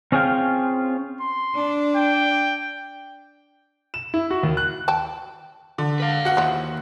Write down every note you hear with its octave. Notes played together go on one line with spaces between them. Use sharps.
C4 C#4 F4 G#4 F5 G5
C6
D4
G5
E7
E4
F#4
D#2
F#6
G5 A5
D3
B4 F5
F#4 F#5
D#2 E3 F3